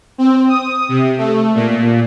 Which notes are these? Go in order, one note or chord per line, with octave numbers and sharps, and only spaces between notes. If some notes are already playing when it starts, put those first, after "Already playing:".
C4
D#6
C3
A3
A#2